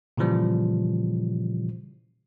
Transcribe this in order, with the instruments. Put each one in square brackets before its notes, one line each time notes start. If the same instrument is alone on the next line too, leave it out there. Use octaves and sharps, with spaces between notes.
[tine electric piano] A#2 C#3 E3 F3 G3